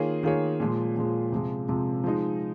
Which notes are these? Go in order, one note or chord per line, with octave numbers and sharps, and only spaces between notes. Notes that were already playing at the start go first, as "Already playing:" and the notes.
Already playing: D#3 A#3 F4 G#4 C#5
D#3 A#3 F4 G#4 C#5
A#2 F3 G#3
A#2 F3 G#3
C3 F3 G#3
C3 F3 G#3
F3 G#3 D#4